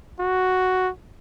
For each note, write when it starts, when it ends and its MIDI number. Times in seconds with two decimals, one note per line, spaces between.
0.20 0.90 66